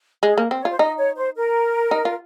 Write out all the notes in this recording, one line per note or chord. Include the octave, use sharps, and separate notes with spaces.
G#3 G#4
A#3
C4 C5
C#5
F4 C5
D#4 D#5
C#5
C5
A#4
D#4
F4